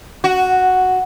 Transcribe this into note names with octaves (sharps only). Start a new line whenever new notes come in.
F#4